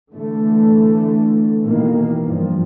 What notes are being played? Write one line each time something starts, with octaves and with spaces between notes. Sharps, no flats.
D3 E3 A3
B2 D#3 E3 A#3
G2 F3